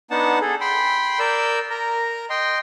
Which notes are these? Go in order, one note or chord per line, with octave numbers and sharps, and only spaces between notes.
B3 D4 D#4 F#5 A5
G#4 A4
G5 B5 C6
A#4 D5 E6 G6
A#4 A#5
D#5 G5 C6